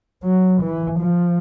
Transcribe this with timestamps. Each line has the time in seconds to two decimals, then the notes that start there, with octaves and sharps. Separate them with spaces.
0.24 F#3
0.61 E3
0.99 F3